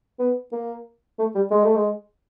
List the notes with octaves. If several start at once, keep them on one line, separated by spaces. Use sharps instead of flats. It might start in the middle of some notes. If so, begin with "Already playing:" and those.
B3
A#3
A3
G3
G#3
A3
G#3